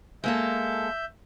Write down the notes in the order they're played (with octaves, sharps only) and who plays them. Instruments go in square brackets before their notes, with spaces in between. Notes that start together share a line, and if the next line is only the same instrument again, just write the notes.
[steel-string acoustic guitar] G#3 A#3 A4 [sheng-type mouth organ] E5 G6